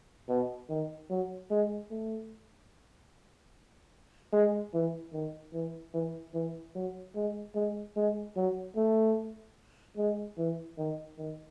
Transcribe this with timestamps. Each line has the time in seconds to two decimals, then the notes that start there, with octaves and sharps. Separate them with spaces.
0.29 B2
0.69 D#3
1.10 F#3
1.51 G#3
1.91 A3
4.33 G#3
4.74 E3
5.13 D#3
5.53 E3
5.94 E3
6.35 E3
6.75 F#3
7.15 G#3
7.55 G#3
7.96 G#3
8.36 F#3
8.77 A3
9.97 G#3
10.38 E3
10.78 D#3
11.18 D#3